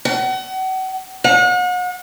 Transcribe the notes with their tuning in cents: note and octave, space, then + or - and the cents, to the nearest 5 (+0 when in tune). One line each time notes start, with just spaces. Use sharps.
F#5 +35
F#5 -40